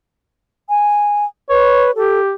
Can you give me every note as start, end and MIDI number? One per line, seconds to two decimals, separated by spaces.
0.69 1.25 80
1.50 1.91 71
1.50 1.88 73
1.96 2.34 67
1.96 2.20 69